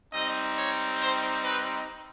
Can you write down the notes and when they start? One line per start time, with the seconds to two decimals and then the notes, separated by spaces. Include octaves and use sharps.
0.13 G3 C4 D#4 D#5
0.57 C#5
1.00 C5
1.43 B4